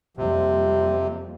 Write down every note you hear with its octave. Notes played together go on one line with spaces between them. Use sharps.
F2 C3 G3 A#3